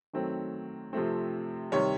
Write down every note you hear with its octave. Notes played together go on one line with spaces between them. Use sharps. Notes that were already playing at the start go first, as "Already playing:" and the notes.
D#3 F#3 A3 C4
C3 F3 A3 C4
C3 D#3 G3 C#5